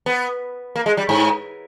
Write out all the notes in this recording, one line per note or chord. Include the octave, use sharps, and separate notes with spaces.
B3
A#3
G#3
G3
G#2